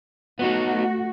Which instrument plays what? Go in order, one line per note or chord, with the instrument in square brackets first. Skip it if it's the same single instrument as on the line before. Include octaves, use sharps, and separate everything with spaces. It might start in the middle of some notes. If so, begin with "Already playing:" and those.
[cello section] A3 F#4 [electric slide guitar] B3 D#4